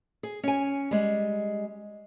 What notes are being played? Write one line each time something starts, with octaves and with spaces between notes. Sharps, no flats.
G#4
C#4 G#5
G3 G#3